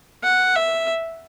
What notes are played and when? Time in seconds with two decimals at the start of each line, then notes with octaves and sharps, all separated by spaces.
0.23 F#5
0.56 E5